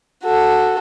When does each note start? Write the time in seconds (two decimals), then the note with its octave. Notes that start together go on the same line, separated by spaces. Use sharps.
0.23 F#4 A4